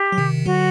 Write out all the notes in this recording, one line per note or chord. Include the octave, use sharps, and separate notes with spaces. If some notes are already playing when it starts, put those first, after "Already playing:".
Already playing: G4
F#3
C3 D#3
D3 F#3 F#4